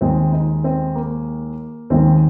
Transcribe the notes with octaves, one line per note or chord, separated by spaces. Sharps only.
D#2 D#3 G#3 C4
D#4
C4
A#3
D#2 D#3 G#3 C4